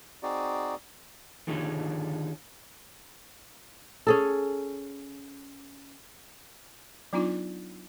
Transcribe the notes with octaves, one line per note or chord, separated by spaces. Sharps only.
C4 D#4 F#4 G#4 D5
D3 D#3 D#4 F4 G4 G#4
C#4 G#4 A4
F#3 B3 D4 D#4 F4